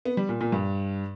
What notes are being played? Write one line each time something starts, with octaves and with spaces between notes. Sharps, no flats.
B3
G3
A#2
A#2
G2